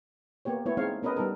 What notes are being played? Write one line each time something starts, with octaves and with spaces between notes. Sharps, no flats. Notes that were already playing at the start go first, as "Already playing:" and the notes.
A#3 B3 G4 C#5
A3 B3 E4 C#5
G#3 C4 D#4 C#5 F5
B3 C#4 A#4 B4 D#5
G3 B3 D#4 A4 A#4